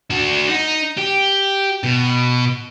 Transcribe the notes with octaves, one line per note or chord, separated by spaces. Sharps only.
D4 F#4
D#4
G4
B2